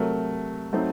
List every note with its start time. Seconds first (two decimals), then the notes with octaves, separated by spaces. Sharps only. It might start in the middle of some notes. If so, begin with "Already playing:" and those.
Already playing: C3 F#3 A3 A#4
0.73 F#3 A3 C4 D#4